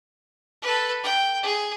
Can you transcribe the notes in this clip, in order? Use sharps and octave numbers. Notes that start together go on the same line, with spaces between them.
A4 B4
G5
G#4